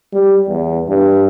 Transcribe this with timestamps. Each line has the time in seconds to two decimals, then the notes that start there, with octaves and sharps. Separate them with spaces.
0.13 G3
0.48 E2
0.88 G2